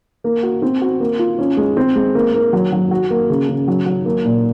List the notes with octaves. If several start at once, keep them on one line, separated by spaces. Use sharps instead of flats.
A#3
F#4
C4
F#4
A#3
F4
C#4
G#3
C4
G#3
A#3
A#3
F#3
F#3
F#4
A#3
C#3
C#3
F#3
F#3
A#3
A#2